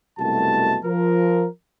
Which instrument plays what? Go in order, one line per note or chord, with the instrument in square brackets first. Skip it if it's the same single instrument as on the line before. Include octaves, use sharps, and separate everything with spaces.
[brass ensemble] C2 F#2 B2 A3 F#4 A5
F3 A#4